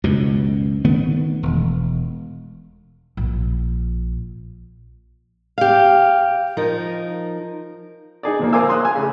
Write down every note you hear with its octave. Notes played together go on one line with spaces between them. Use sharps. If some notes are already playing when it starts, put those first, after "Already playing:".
C#2 F#2 B2
D#3 A3 B3
E1
A#1
G4 F5
F3 D#4 A#4
D#4 G#4 D5
A#2 F3 A#3
A#4 C5 F5 G#5 D6 E6
C6 D#6 E6 F#6
F5 G#5
C#3 A3